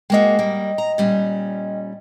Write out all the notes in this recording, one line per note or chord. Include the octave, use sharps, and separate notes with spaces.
G#3 A#3 F#4 D#5 G5
G3 A#3
A#5
A#2 G3 C#4